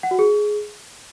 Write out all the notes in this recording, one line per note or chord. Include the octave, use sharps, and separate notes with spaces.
F#5
F#4
G#4